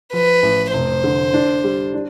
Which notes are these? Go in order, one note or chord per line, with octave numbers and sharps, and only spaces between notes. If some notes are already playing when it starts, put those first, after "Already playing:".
F3 B4
A1
F1 C5
D3
D4
G3
D4